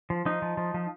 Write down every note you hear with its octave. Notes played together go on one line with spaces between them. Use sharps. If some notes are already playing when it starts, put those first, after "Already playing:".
F3
F3 D#4
F3
F3
F3